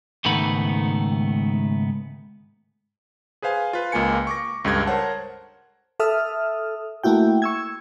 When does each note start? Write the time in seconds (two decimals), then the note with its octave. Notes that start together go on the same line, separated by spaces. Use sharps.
0.25 C#2 G#2 D#3 A3 B3 B5
3.42 G#4 B4 C5 F5 G#5
3.73 F4 B4
3.92 C#2 A#3 F4 G#5 C#7
4.27 C#6 D6 A#6
4.65 C#2 G2 A4 G#6
4.87 A#4 C5 C#5 F#5 A5
6.00 A4 E5 D#6 F6
7.03 A3 A#3 E4 F#4 G5
7.42 C#6 E6 G#6